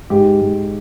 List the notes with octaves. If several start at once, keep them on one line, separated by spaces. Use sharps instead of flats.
G#2 G4
G#2